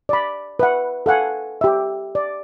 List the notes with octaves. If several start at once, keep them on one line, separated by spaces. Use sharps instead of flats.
D5 B5
B4 E5 F#5
A4 F5 F#5 G#5
G4 E5
D5